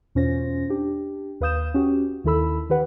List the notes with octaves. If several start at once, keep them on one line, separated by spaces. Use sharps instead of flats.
E2 B2 C#4 F4 C5 A#6
D4 G4
D#2 B4 F5 D#6 G6 E7
C#4 F#4 G4
D#2 D#3 E4 A4 B5 E6
D#3 G4 B4 F#5